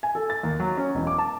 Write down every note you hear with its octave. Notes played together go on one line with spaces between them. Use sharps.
G#5
A4
A6
D#2
F#3
C#4
E1
D6
A5